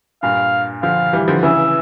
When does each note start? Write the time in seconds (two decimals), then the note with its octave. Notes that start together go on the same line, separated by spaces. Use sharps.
0.23 G2 A#2 F5
0.82 D3 F3 F5
1.13 E3 G3
1.28 D3 F3
1.43 C#3 E3 E5